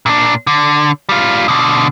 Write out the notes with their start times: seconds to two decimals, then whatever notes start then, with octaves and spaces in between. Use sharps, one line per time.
0.06 A#2 D4
0.47 D3
1.09 G3 F4
1.48 B2 D3